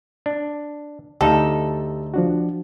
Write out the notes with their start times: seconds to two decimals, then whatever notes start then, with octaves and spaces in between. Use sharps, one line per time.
0.26 D4
1.21 D2 D#4 G4 A4 F5
2.14 F3 D4 F#4